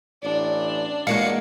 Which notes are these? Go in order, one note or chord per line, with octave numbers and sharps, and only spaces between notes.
A1 D4
A1 G#3 A#3 F#4 F5 C#7